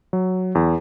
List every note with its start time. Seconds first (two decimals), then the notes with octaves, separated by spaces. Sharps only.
0.13 F#3
0.55 E2